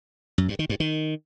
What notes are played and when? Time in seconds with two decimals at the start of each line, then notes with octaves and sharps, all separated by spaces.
0.38 F#2
0.48 G2
0.59 D#3
0.69 G2
0.80 D#3